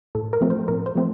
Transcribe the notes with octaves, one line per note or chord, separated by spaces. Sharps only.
A2 A4
A#4
F3 A3 C4
C5
A2 A#4
C5
F3 A3 C4